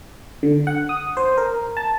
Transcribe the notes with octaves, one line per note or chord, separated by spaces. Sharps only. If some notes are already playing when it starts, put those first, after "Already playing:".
D3
F#5
D#6
C5
A#4
A5